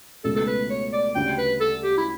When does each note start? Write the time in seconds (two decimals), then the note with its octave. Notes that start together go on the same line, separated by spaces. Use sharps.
0.24 C#2 B2 A3 A4
0.36 A4
0.47 B4
0.70 C#5
0.93 D5
1.15 D2 C#3 G3 C#4 G5
1.38 B4
1.61 A4
1.83 G4
1.98 E4